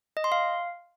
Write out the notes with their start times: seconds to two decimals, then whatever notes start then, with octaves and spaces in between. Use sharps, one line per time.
0.17 D#5
0.24 C6
0.32 F5